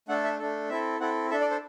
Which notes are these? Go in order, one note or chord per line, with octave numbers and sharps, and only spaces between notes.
A3 D4 A4 F#5
E5
A3 D4 A4
C4 E4 A4 E5
C4 E4 A4 F#5
D4 A4 E5
D5
C5